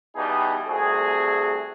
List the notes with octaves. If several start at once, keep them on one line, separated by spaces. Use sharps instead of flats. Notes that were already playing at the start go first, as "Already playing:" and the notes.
B2 E3 G3 B3 D#4 G#4
C2 A3 C4 F#4 G#4